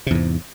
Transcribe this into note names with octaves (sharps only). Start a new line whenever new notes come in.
E2 G#2 C3